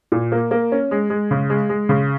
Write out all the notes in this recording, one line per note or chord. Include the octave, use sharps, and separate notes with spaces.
A#2
A#3
A#3
C#4
G#3
G#3
C#3
G#3
G#3
C#3